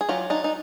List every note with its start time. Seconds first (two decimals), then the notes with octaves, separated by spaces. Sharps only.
0.01 G#4
0.09 F#3 F4 G4
0.30 D4 D#4
0.44 D#4